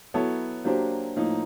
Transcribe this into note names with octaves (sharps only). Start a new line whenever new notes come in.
F#3 B3 E4 A4 C#5
F#3 A#3 D4 G4 C5
A2 F3 A#3 D#4